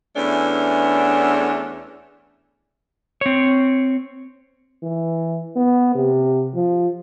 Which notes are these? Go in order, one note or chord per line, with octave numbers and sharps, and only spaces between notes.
E2 A3 B3 C#4 D4
C4 C#5
E3
B3
C3
F3